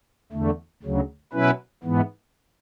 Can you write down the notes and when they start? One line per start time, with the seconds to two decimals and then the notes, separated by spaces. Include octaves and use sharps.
0.32 E2 D3 A3
0.83 D2 C#3 F#3
1.33 B2 F#3 C#4 E4 B4
1.84 G#2 E3 B3